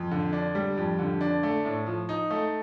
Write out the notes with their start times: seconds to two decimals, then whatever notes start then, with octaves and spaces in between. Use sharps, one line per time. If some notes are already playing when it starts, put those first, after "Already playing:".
Already playing: F2
0.11 D3
0.33 D4
0.55 G3
0.77 F2
0.99 D3
1.21 D4
1.43 A3
1.65 A2
1.86 F3
2.09 D#4
2.31 A3